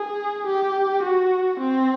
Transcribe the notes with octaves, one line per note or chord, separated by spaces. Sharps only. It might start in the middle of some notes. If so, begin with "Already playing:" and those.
Already playing: G#4
G4
F#4
C4